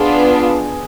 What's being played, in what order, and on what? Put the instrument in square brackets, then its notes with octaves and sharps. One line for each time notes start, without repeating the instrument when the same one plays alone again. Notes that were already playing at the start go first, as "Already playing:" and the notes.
Already playing: [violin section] B3 D4 F4 [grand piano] G#4